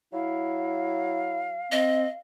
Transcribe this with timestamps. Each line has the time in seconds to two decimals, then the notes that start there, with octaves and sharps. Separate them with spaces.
0.13 F#3 E4 F5
1.72 C4 D#5